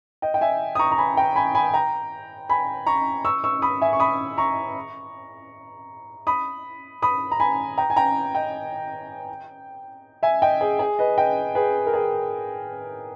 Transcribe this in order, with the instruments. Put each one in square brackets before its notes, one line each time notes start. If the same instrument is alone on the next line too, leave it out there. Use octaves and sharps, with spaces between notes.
[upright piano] D#5 G5
G5
E5 G#5
D#6
A#5 C#6
A#5
G#5 B5
G5 A#5
G#5 B5
G#5 B5
G5 A#5
G#5 B5
A#5 C#6
C#6 E6
C#6 E6
B5 D#6
E5 G#5
C#6
B5 D#6
A#5 C#6
B5 D#6
B5 D#6
A#5
G#5 B5
G5 A#5
G#5
G5 A#5
D#5 G5
E5 G#5
D#5 G5
G#4
G#4
B4 D#5
D#5 G5
G#4 B4
A#4
G#4